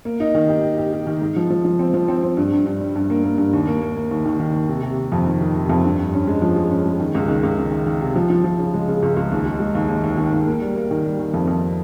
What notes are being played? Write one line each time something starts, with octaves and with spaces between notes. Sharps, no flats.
A#3
D#4
D#3
G4
G4
G4
G4
D#3
G#2
F3
F3
F3
C4
F3
C4
C4
G2
G2
G2
G3
G2
A#3
A#3
G2
D#2
A#3
A#3
A#3
D#2
D#3
D#3
D#2
C3
C3
C3
F2
D#3
D#3
C3
F2
G2
G2
C#4
G#3
F3
G#3
C#4
G#3
D#3
C#2
D#3
C#2
D#3
D#3
D#3
C3
F3
F3
F3
C#3
G#3
C#3
C#2
C#2
D#2
G#3
G#3
D#2
D#2
D#2
D#3
D#2
A#3
G3
A#3
D#3
G3
D#3
F2
F2